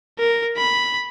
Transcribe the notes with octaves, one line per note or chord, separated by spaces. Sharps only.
A#4
B5